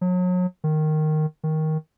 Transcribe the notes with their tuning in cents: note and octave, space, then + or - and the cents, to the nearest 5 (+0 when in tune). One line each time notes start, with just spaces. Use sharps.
F#3 -35
D#3 -10
D#3 +10